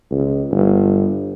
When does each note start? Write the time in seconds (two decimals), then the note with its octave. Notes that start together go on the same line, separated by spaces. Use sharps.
0.11 C#2
0.52 G1